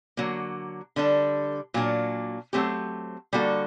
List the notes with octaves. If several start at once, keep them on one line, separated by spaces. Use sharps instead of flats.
D3 F#3 A#3
D3 G3 D4 A4
A#2 F#3 A#3 D4
F#3 A3 C4 G4
D3 G3 A#3 F#4 A4